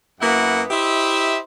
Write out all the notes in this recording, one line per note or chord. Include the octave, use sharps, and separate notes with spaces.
F#2 A#3 B3 E4 F#4 F#5
E4 G4 C5 D#5 E5